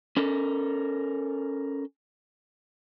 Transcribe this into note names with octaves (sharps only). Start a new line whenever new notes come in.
C#4 A4 A#4